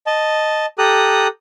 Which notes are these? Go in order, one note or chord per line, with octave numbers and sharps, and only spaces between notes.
D#5 A5
G4 A4 A#5 D#6 F#6